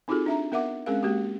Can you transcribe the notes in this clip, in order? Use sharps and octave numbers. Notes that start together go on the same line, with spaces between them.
C4 D#4 F4 F#4 G#4 A4
D4 E5 A#5
B3 A#4 E5 F#5 D6
G#3 C4 C#4 G#4 A#4 F5
G#3 A#3 F#4 G4